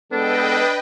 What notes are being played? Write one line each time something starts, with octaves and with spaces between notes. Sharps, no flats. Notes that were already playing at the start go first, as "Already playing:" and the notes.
G#3 B3 D4 A4 B4 D#5 G5